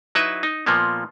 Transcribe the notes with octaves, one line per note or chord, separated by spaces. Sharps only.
F#3 D#4 E4 B4 E5
D#4
A#2 F3 A#3 B3